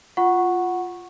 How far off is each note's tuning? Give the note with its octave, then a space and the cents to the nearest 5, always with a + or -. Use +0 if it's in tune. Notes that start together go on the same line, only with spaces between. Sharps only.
F4 +0 F#5 +0 C#6 -10